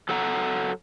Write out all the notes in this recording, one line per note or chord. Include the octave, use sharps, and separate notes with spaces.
F#3 A4 F#5 A#5